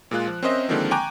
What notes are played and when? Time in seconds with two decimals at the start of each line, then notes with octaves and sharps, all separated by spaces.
0.11 A#2 G#3 F4 F#6
0.28 F3
0.43 C4 C#4 A#4 C5 D#5 E5
0.69 D3 D#3 F3 G#3 A#3 C4
0.91 G5 G#5 A#5 C#6 D6 F#6